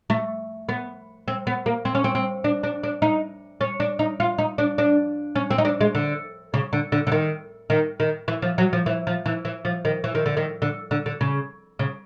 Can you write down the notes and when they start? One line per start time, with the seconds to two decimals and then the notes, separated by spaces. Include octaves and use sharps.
0.10 A3
0.69 B3
1.28 C4
1.47 B3
1.66 A#3
1.85 C4
1.95 C#4
2.04 C4
2.15 C4
2.44 D4
2.63 D4
2.83 D4
3.02 D#4
3.61 C#4
3.80 D4
3.99 D#4
4.20 F4
4.38 D#4
4.58 D4
4.78 D4
5.36 C#4
5.51 C4
5.58 D#4
5.65 D4
5.81 G#3
5.95 D3
6.54 C#3
6.73 D3
6.92 D3
7.07 D3
7.12 D#3
7.70 D#3
8.00 D#3
8.28 E3
8.42 F3
8.58 F#3
8.73 F3
8.86 E3
9.07 F3
9.26 E3
9.45 E3
9.65 F3
9.85 D#3
10.04 E3
10.15 D#3
10.26 D3
10.37 D#3
10.62 D3
10.91 D3
11.06 D3
11.21 C#3
11.79 C#3